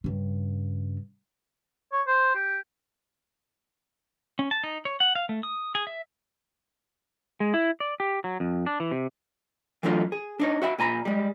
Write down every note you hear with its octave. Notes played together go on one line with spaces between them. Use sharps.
G2 C#3
C#5
C5
G4
C#4
A5
D#4
C#5
F#5
F5
A3
D#6
G#4
E5
G#3
E4
D5
G4
F#3
F2
D4
E3
C3
E3 F#3 A3 D4 F4
G#4
D4 D#4 C#5
F#4 E5 F#5 B5
A#2 G#5 A#5 B5
G3 G#3